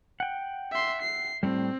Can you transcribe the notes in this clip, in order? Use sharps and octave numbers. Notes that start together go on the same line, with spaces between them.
F#5 G5
E5 C6
C7
A2 G3 C4